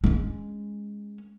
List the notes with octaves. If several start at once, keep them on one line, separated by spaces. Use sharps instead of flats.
G#3 C#4